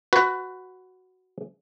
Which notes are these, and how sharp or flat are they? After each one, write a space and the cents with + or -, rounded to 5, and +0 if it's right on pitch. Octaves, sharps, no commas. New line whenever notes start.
F#4 +0 B4 +20